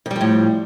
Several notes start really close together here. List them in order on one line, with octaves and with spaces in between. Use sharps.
F2 G3 F3 A2